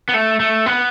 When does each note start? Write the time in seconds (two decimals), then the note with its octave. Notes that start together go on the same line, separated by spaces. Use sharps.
0.09 B3
0.14 A3
0.40 A3
0.66 B3